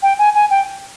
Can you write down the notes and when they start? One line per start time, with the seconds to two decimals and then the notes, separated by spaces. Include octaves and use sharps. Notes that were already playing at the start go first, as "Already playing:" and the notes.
0.02 G5
0.18 G#5
0.34 G#5
0.50 G5